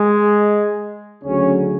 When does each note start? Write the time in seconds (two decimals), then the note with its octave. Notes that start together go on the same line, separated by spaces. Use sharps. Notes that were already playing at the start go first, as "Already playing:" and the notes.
Already playing: G#3
1.24 D2 C#3 F#3 C#4